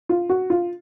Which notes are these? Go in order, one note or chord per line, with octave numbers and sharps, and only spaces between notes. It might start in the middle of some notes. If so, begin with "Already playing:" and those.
F4
F#4
F4